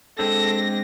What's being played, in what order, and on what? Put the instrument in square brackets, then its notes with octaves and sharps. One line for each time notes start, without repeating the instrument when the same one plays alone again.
[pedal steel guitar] G#3 C4 D4 [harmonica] A4 [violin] A#6